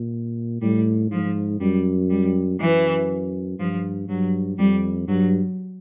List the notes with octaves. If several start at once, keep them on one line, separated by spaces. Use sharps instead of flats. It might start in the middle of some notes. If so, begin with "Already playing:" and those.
Already playing: A#2
A2 G3
G#2 F3
F#2 G3
G3
F#2 E3
G2 F3
G2 F#3
F2 G3
G2 F#3